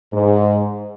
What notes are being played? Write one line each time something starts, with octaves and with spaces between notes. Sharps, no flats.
G#2